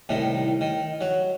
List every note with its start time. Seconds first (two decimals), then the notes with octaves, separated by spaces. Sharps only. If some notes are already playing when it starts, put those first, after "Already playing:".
0.09 C2 A2 D#3
0.61 D#3
1.01 F#3